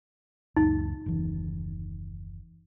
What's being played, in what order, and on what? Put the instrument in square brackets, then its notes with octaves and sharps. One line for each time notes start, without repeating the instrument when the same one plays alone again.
[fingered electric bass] C#2 F#2 A#2 [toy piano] D#4
[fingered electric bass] F#1 D#2 E3